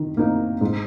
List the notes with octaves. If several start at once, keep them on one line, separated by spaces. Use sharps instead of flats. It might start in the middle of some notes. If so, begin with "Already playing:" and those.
Already playing: D#3
A#3 D#4
G#2